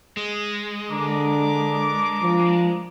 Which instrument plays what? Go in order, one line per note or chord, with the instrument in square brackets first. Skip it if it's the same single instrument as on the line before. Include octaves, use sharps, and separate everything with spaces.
[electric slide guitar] G#3
[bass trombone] D3 [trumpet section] D4 A#4 D6
[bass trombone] F3